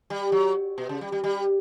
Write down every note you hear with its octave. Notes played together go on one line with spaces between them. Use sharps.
G3
F#3
B2
C#3
G3
G3
G3